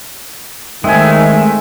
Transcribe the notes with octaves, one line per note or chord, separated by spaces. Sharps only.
D#3 G#3 A3 C4 E5 G#5